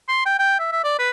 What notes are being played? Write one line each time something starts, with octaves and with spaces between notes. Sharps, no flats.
C6
G5
G5
E5
E5
D5
B4